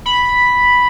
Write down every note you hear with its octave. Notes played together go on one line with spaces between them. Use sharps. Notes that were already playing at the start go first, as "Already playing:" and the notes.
B5